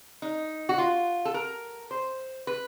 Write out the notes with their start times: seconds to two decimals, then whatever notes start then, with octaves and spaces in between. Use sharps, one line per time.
0.22 D#4
0.69 F#4
0.78 F4
1.25 A4
1.34 A#4
1.91 C5
2.47 B4